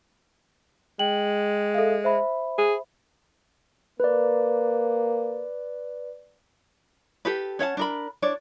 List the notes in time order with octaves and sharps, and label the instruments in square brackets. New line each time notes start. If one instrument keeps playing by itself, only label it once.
[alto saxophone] G#3 [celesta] G5 F#7
[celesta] A4 E5 F5
C5 E5 B5
[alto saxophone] G#4
[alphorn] A#3 [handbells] B4 D5
[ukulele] G4 A4 B4
C#4 C#5 F#5 A5
D4 A#4 B5
D4 C#5 D5